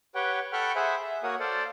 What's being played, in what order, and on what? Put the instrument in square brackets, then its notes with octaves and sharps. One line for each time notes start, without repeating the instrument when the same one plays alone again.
[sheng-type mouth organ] G4 B4 C#5 F#5 G5
A4 F#5 G5 B5 C#6 F6
G#4 C5 E5 F#5 G#5 B5
E5
A#3 F#4 A#4 C#5 F#5 D#6
A4 C5 D5 F5